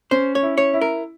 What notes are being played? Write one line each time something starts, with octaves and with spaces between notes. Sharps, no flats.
C#4 C5
C#5
E4
C#5
E4
A#4